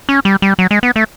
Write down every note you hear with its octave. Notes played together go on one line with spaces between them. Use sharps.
C#4
G3
G3
F#3
G#3
B3
A3